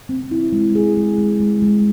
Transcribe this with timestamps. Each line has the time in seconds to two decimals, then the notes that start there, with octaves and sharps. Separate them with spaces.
0.09 C4
0.31 E4
0.52 G#3
0.75 G#4
0.97 G#3
1.18 G#3
1.40 G#3
1.62 G#3